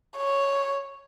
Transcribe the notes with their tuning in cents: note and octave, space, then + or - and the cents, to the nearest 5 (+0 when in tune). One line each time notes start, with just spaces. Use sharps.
C#5 +0